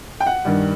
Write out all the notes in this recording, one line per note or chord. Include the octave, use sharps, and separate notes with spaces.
G5
F#5
G2 D#3 G3